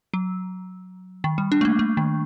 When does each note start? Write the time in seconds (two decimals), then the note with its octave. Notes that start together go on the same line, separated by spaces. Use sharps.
0.14 F#3
1.24 D#3
1.38 G3
1.52 D4
1.61 A3
1.65 A#3
1.79 A3
1.97 D#3